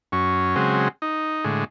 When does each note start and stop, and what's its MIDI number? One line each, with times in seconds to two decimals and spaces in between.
0.12 0.55 42
0.12 0.55 61
0.56 0.88 49
0.56 0.88 54
0.56 0.88 56
0.56 0.88 60
1.02 1.44 63
1.44 1.64 45
1.44 1.64 50
1.44 1.64 56